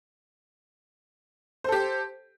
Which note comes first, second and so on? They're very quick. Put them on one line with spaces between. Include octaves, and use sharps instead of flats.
C5 A4 G4